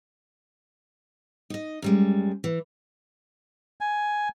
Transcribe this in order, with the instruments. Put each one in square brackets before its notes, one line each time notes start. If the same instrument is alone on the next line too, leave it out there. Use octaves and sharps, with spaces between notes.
[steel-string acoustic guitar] D#4 D#5
F#2 G3 G#3
E3
[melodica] G#5